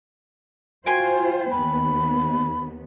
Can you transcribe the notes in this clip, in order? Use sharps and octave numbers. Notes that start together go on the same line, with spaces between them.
F4 F#4 C5 G5 G#5 C6
D#2 B3 B5